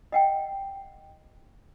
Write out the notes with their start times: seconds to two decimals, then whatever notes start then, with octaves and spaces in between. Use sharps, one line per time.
0.12 D#5 F#5 G5